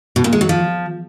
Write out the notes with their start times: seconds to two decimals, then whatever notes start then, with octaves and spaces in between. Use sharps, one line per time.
0.16 B2
0.24 A#2
0.33 G#3
0.41 F#3
0.49 F3